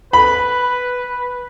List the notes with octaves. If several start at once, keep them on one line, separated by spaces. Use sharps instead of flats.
B4 B5